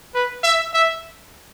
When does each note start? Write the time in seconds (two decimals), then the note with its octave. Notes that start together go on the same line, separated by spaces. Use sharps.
0.14 B4
0.43 E5
0.73 E5